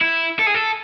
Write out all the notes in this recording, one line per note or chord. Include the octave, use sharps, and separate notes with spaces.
E4
A4
G#4
A4